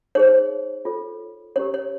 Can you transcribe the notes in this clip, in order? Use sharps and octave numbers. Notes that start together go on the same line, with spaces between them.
D#4 G#4 C5 C#5
F4 A4 C#5
C#4 E4 G4 A#4 C#5
C#5